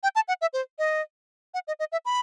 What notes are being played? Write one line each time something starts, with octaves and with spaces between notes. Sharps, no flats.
G5
A5
F#5
E5
C5
D#5
F#5
D#5
D#5
E5
B5